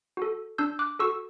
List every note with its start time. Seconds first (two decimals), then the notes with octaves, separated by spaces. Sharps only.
0.17 F#4 A4
0.58 D4 E6 G6
0.79 D6 F#6
0.99 F#4 A4 C#6 E6